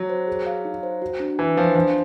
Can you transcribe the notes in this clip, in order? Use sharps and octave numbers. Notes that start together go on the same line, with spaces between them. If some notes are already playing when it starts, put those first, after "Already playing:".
Already playing: F#3 F#4
C5
G#4
F5
D#4
C5
F#4
D4
E3 D4
F3 B4
F3 D4